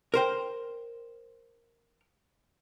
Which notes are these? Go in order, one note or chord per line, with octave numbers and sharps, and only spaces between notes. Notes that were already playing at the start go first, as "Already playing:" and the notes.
A#4 C5 G5